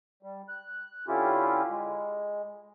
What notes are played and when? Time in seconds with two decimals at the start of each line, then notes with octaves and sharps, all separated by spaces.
0.23 G3
0.49 F#6
1.08 D3 C#4 E4 F4 G4
1.70 G#3